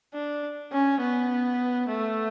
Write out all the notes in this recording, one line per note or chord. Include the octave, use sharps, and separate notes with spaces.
D4
C#4
B3
A3